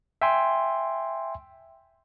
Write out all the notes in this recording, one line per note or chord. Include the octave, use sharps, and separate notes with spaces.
E5 G5 G#5 C6